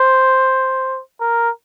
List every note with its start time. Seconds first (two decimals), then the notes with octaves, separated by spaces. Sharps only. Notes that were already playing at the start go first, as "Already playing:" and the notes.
Already playing: C5
1.21 A#4